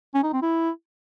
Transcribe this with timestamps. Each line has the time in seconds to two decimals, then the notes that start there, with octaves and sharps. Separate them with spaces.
0.14 C#4
0.23 D#4
0.33 C4
0.42 E4